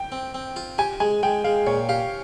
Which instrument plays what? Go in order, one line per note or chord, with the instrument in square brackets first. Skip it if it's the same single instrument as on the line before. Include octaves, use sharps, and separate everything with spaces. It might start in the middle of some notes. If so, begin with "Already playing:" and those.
Already playing: [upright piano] G5
[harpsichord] C4
C4
F4
[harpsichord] G4 [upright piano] G#5
[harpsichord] G#3 [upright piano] G#5
[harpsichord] G#3 [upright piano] G5
[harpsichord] G#3 [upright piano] F5
[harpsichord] A#2 [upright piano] C#5
[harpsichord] G4 [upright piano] F5